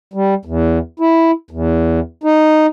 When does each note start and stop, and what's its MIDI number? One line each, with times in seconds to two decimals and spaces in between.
0.14 0.34 55
0.45 0.79 40
1.00 1.31 64
1.51 2.00 40
2.24 2.66 63